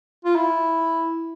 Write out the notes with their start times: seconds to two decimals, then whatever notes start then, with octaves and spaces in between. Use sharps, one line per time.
0.24 F4
0.35 E4